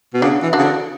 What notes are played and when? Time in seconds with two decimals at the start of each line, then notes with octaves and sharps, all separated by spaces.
0.14 B2
0.22 C#3 D4 F#4
0.42 E3
0.53 D4 F#4
0.59 C#3
0.64 D3